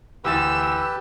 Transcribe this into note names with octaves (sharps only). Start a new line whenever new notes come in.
D2 E3 G4 B4 E6 A6